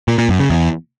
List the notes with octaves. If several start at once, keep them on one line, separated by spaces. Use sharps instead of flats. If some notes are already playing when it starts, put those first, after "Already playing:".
A#2
A#2
F#2
C#3
E2